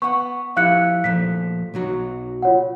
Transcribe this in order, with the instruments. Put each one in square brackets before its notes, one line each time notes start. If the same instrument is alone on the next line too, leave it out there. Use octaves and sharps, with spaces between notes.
[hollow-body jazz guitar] B3 F#5 [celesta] C#6
[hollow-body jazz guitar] F3 E4 G4 [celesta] F5 F#6 C#7
[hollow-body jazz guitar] A#2 F3 A3 [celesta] B6
[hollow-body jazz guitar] B1 F#3 F#4
[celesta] F4 C#5 F#5